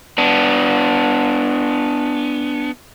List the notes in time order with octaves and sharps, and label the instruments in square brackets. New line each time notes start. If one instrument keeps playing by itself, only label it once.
[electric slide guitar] B3 D4